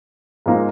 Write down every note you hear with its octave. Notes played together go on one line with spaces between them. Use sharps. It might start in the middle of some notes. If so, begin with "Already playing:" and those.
G#2 F3 A#3 D#4